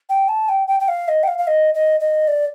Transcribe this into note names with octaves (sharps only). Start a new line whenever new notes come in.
G5
A5
G5
G5
G5
F5
D#5
G5
F5
F5
D#5
D#5
D#5
D5